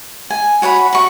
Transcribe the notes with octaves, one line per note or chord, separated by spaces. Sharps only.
G#5
F#4 C#5 F#5 B5
F#4 C#6